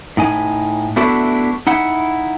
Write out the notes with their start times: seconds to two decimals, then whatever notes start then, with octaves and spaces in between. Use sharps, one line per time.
0.17 A2 D#4 G#5
0.96 A3 B3 D4 E4 F#4 A4
1.67 D#4 E4 F#5